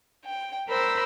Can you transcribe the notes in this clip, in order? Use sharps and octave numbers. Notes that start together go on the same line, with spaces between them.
G5
A#4 C5 B5 E6